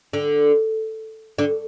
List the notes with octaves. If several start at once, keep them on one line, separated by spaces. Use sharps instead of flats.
D3
D3